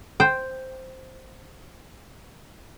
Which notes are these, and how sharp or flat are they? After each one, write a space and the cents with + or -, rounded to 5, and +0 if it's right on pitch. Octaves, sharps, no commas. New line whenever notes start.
C5 +0 G5 +0